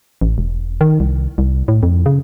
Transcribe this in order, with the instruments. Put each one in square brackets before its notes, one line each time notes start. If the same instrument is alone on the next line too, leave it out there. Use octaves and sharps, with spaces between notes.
[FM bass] A1
E1
D#3
C2
C2
A2
F2
C#3